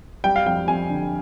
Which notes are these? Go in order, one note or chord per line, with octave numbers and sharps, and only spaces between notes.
G3 G5
F5
F2 G5
F2 G#5
D3